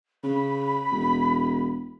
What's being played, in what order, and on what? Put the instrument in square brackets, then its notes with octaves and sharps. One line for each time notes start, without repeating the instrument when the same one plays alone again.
[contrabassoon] C#3 [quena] B5
[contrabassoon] E1